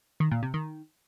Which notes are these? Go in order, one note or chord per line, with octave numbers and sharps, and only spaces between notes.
D#3
A#2
C3
D#3